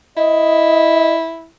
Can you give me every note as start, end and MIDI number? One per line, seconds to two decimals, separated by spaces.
0.17 1.48 64
0.17 1.14 75